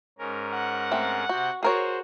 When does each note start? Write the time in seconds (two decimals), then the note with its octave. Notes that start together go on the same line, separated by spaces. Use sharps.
0.19 G#2 C#4 A#4
0.52 F#5
0.91 A3 C4
1.29 C3 F#4 G6
1.63 F#4 G#4 A#4 C5 C#5